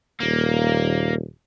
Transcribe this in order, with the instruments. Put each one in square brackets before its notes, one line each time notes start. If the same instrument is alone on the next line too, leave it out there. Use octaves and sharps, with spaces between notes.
[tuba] D#1 [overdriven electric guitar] A#3